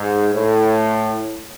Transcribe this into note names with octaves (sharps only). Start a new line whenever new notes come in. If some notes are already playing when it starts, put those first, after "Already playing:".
Already playing: G#2
A2